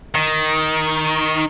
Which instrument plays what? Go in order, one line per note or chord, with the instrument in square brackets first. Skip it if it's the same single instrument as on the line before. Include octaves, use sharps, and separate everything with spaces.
[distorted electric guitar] D#3